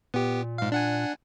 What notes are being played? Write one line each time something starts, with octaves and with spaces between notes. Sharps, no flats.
A#2 B3 G4
G#2 F5
D4 F#5 G#5